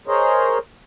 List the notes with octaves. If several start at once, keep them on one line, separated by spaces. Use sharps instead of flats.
G#4 A#4 C5 C#5 D#5